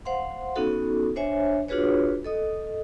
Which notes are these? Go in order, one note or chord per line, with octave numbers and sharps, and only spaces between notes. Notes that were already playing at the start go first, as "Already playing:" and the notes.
C5 F5 F#5 C6
B3 C#4 D#4 F#4 A4
D4 C5 C#5 E5 G#5
D4 F4 F#4 G#4 B4 C#5
A4 D#5 D#6